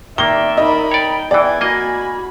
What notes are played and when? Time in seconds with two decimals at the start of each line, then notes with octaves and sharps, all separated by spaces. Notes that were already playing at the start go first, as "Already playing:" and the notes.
0.18 D#3 A#3 D5 E5 G7
0.57 D#4 A#4 B5
0.91 C#5 D5 G5
1.31 E2 E3 D5 G#5
1.61 A#3 F#4 D#5 B5